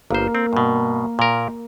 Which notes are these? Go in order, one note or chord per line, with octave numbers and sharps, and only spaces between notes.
G1 A#3 C5
C4
G2 B2
A#2 A#4